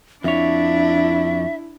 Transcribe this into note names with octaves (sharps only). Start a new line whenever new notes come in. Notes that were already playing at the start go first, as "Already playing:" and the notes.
F2 D4 E4 C#5 E5